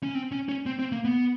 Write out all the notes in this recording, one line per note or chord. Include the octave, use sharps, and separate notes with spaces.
C#4
C4
C#4
C#4
C4
C4
A#3
B3